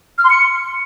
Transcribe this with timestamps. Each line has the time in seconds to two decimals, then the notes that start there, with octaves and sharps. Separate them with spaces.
0.18 F6
0.24 C6
0.30 C#7